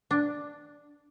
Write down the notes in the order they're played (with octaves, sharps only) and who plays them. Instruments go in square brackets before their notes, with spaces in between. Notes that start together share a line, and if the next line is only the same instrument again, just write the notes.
[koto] D4